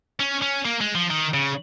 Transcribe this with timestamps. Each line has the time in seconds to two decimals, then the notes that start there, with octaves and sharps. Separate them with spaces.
0.20 C#4
0.42 C#4
0.65 A#3
0.81 G#3
0.95 F3
1.10 D#3
1.34 C#3